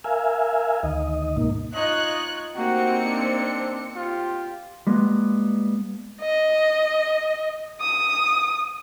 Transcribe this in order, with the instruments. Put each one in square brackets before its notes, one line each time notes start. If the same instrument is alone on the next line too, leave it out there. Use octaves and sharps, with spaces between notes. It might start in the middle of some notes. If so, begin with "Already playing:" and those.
[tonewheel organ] A#4 E5 F5 G#5
D2 D#3 D#5
G#2 B2 A#3 D#4
[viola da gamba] D#4 F4 C#5 [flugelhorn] D#5 [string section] F#6
[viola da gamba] A#3 D#4 G4 [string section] C4 C#7 [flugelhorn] F#4
[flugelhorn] D4
[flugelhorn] F4 [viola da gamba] G4
[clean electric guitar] G3 G#3 A#3 B3
[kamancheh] D#5
D#6